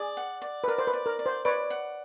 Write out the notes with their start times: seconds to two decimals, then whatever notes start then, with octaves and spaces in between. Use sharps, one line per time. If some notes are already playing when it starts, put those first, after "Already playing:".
Already playing: G#4 D5
0.17 F#5
0.42 D5
0.64 B4
0.68 A#4 D5
0.78 C5
0.87 B4
0.93 D5
1.06 A#4
1.19 D5
1.26 C5
1.45 B4 C#5 D5
1.70 F#5